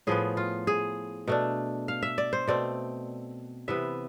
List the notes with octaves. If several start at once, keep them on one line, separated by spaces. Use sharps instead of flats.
A2 F3 B3 G#4
F4
G#4
B2 A3 D4
F5
E5
D5
C5
B2 A3 C4 D5
C3 E3 B3 E5